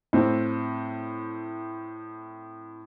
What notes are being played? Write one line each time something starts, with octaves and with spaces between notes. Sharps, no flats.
A2 C4